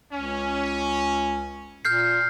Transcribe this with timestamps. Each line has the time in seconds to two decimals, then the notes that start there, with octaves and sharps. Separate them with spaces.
0.13 C#2 C#4
1.85 A#2 F6 G6 C7